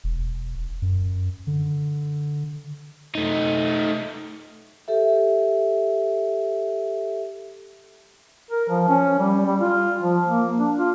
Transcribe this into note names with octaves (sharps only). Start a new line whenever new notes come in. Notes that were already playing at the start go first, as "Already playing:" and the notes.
E1
F#2
D3
A3 D#4
G4 A4 E5
A#4
F3
C#4
G3
G3
F4
F3
A#3
D4
F4